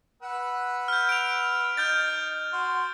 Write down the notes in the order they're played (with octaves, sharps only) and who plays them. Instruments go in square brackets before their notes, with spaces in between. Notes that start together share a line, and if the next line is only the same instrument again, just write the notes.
[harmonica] B4 F#5 E6
[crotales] F6 G6
D7 F7
[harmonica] D#4 [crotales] F6 G6 A6
[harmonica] F#4 C6